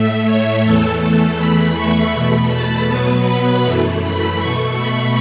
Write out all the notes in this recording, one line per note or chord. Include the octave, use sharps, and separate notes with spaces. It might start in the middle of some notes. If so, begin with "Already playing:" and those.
Already playing: A2 A3 E5
C#5
E2 E3 A3 A4
E2 E3 A3 B5
C#6
E2 B2 A3 B5
A5
B2 F#3 B3 B4
B5
F#2 E3 A3
B5
B2 A3 C#6
B5